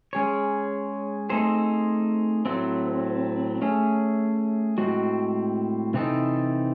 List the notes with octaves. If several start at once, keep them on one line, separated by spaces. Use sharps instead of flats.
G#3 C#4 G#4 C#5
A3 C4 D#4 G#4 C5
A2 F#3 A3 C4
A3 C#4 G#4
A2 G#3 C4 F#4
C3 E3 C4 D#4 A4